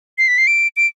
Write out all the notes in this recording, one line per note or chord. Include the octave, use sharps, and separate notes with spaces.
C7
B6
C7
D7
D7